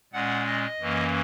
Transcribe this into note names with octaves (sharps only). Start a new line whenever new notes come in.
A#2 G#3 C#4 F#5
D#5
F#2 E3 A#3 C#4